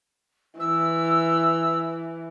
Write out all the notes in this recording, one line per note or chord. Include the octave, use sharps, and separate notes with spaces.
E3 E6